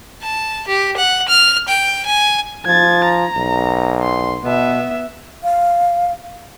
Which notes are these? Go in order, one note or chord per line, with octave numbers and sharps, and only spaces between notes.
A5
G4
F#5
F6
G5
G#5
F3 G#6 A6
A#5
B1
C6
B2 B3 E5
F5